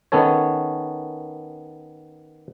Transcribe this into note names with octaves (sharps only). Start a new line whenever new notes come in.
D#3 B3 C#4 A4 C#5